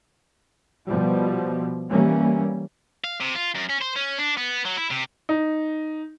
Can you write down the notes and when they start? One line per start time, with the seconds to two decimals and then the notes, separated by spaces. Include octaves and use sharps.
0.87 B2 F3 G3
1.91 E3 G3 A#3 C#4
3.04 F5
3.21 C3
3.36 F4
3.55 F#2
3.70 C#4
3.82 C5
3.96 C#4
4.19 D4
4.37 B3
4.65 F#3
4.77 E4
4.91 C3
5.29 D#4